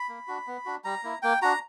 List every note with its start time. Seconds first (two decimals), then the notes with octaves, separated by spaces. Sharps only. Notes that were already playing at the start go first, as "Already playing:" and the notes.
Already playing: B5
0.09 A#3
0.28 D4 F#4
0.47 B3
0.66 D4 F#4
0.84 G3 A#5
1.03 A#3 E4
1.22 A#3 G5
1.42 D4 F#4 A#5